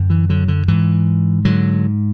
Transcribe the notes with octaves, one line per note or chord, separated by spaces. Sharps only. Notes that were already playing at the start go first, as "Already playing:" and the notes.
Already playing: F#2 D3
E3
D3 F#3
D3
G#2 E3
G#2 D3 F#3